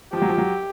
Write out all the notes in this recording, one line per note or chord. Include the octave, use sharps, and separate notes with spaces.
F3 G4
F#3
F3
F#3